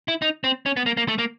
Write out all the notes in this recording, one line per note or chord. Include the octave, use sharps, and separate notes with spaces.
E4
D#4
C4
C#4
B3
A#3
A#3
A3
A#3